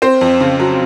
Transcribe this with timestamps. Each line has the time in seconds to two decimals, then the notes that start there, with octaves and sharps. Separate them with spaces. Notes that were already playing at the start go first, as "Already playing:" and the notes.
0.02 C4 C5
0.21 F2
0.40 C#3
0.60 F#3